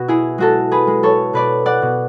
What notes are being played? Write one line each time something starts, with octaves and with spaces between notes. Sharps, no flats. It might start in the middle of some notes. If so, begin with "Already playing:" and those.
Already playing: B2 F#4
E4 G#4
G#3 F#4 A4
G#4 B4
G#3
A4 C#5
B2 B4 D5
D5 F#5
B2